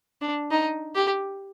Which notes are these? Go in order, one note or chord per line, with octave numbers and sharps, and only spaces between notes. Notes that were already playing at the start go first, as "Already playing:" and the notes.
D4
D#4
G4